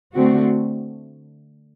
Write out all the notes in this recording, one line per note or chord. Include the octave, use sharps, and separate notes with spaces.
D3 A3 C4 F#4